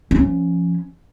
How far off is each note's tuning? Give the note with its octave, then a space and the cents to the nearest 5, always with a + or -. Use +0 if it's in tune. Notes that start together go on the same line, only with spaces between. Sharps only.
F3 -20 C#4 +0